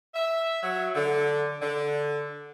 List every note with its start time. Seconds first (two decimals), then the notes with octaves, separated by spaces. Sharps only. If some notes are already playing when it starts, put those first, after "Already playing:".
0.14 E5
0.62 F#3
0.95 D3
1.61 D3